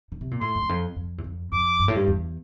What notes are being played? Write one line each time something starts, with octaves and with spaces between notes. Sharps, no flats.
D3
C3
A#2
A2 C6
F2
E2
F2
F2
E2
F2
F2 D6
G2
A2
G2
E2